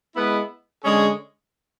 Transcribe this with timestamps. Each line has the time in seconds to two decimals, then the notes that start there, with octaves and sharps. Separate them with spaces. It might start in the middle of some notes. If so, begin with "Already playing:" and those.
0.15 G#3 B3 E4 B4
0.84 D3 G#3 C#4 G#4